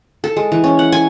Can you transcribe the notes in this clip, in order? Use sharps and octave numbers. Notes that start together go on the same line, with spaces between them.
A4
G#3
E3
C#4
F#5
G#5